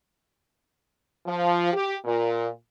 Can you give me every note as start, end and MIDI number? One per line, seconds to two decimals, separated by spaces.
1.26 1.71 53
1.73 1.94 67
2.05 2.47 46